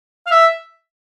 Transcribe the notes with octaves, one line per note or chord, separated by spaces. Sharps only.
F5
E5